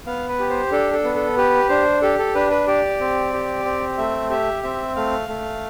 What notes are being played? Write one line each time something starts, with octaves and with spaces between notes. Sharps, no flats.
B3 F5
B4
G4
C5
D4 A4
A4
B3
A4
G4 B4
D4 C5
G4 A4
A4
D4 B4
B4
G4 D5
C4
G4
C4
A3 E5
G4 E5
C4 E5
A3 F5
A3